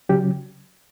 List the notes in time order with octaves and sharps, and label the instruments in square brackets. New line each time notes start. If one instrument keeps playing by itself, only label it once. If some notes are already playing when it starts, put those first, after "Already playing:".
[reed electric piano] C#3 F#3 C#4 G4